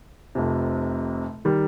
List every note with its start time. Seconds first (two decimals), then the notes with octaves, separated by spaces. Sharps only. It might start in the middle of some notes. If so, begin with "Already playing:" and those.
0.35 F1 F2 C3
1.45 D#3 G3